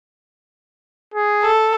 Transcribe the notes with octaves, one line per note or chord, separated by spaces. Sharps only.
G#4
A4